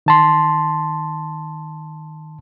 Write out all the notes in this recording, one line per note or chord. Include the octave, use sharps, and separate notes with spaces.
D#3 A5 C6